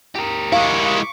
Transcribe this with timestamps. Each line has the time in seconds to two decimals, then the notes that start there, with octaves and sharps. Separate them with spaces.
0.15 G4 A#4
0.52 G#3 E4 F5 C#6 D6